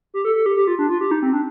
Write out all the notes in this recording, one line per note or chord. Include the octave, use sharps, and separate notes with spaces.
G4
A4
A4
G4
G4
F4
D4
F4
G4
D#4
C4
D4